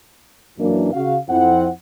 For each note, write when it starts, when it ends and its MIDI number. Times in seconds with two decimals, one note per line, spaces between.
0.58 0.89 42
0.58 0.89 52
0.58 0.89 58
0.58 0.89 62
0.93 1.17 49
0.93 1.17 66
0.93 1.17 77
1.29 1.69 41
1.29 1.69 60
1.29 1.69 64
1.29 1.69 78